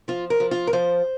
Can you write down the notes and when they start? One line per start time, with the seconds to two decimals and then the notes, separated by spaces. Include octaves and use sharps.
0.08 F3 F4
0.30 A#4
0.40 F3
0.51 F4
0.67 A#4
0.73 F3 C5